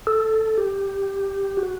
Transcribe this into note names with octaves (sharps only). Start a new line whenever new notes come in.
A4
G4
F#4